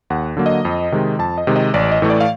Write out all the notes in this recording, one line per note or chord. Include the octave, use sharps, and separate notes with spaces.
D#2 F#5
D3 F#3 A#3
D#5
F2
C3 D#3 G#3
F2 A5
D#5
C3 D#3 G#3
D#5
A1 D5
D#5
A2 E3 A3
D5
F5